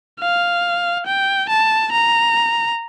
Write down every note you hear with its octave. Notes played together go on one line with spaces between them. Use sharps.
F5
G5
A5
A#5